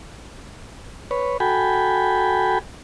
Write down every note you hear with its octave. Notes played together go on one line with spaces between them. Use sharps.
B4 C#5
F#4 A4 G5 G#5 B5